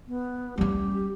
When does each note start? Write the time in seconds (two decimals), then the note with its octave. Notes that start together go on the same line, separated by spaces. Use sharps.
0.08 B3
0.58 G3 C#4 G4